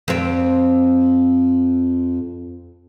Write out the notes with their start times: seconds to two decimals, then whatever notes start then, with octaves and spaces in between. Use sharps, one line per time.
0.08 F2 C4